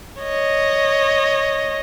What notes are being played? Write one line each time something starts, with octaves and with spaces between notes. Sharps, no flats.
C#5 D#5